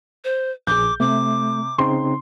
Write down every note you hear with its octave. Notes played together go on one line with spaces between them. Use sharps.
C5
A#1 G#4 D6 G6
C3 A3 D6
C#3 C4 D#4 C6